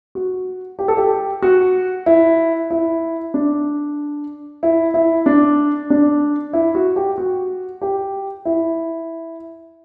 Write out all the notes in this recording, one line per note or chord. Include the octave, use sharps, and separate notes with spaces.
F#4
G4
A4
G4
F#4
E4
E4
D4
E4
E4
D4
D4
E4
F#4
G4
F#4
G4
E4